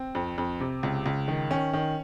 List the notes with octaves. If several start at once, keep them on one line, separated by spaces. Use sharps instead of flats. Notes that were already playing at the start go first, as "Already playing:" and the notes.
Already playing: C4
F2
F2
C3
C#2
C#2
D#3
D#3 C#4
D#3